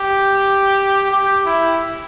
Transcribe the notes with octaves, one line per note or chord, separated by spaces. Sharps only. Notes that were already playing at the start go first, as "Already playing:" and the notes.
Already playing: G4
G4
E4